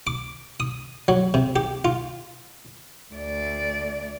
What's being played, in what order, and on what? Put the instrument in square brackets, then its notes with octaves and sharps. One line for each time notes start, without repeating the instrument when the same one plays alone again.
[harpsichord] D6
D#6
F#3
C3
G4
F4
[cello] D2 D5